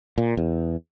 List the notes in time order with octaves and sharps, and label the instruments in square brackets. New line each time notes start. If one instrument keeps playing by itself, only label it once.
[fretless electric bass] A#2
E2